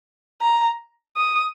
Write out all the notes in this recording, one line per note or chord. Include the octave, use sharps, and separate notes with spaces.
A#5
D#6